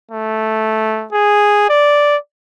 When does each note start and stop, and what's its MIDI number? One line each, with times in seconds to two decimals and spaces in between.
0.11 1.07 57
1.12 1.69 68
1.69 2.16 74